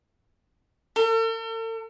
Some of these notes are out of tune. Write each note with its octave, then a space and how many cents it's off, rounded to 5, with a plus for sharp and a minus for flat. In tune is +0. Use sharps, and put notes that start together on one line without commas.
A4 +45